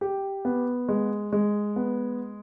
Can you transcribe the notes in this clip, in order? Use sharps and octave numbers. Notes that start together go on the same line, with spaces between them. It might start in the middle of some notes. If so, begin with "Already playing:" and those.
G4
B3
G#3
G#3
B3